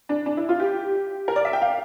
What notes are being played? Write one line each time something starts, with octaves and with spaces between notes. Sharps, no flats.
D4
D4
E4
F4
G4
A#4
D5
E5
G5
F5